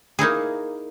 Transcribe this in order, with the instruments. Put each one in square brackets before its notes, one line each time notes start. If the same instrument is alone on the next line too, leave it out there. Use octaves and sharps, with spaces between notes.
[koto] A#3 D#4 E4 G#4